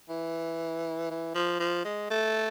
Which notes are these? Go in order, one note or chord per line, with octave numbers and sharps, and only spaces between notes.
E3
E3
F3
F3
G#3
A3